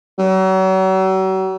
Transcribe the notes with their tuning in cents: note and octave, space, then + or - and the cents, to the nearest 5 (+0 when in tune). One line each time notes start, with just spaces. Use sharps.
F#3 +40